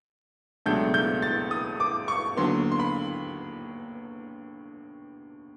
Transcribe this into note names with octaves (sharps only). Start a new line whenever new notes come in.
C#2 B2 F#3 A3 D4 G6
G6
A6
D#6
D6
C#6
D#2 D3 F#3 B3 C6
C6
B5